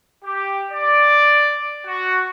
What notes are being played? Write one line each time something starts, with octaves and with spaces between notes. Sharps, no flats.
G4
D5
F#4